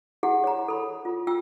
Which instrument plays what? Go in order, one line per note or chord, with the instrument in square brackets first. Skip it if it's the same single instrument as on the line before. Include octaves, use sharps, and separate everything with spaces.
[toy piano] E4 G4 G#4 F#5
C#5 A#5
A4 B5
F4
F4 G5 E6